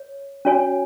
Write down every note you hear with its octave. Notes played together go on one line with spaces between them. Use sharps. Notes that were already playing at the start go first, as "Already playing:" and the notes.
Already playing: C#5
C#4 F#4 C#5 G#5